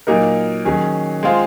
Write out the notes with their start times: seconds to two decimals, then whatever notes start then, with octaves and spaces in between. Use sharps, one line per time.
0.07 A#2 F#3 A#3 D#4 A#4
0.65 D#3 F#3 C#4 G#4
1.23 G#3 C4 F4 G#4